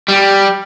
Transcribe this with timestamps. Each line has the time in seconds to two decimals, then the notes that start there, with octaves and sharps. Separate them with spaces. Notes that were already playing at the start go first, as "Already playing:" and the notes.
0.08 G3